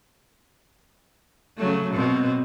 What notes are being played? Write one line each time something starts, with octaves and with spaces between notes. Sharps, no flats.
C#3 F#3 A3
B2 C4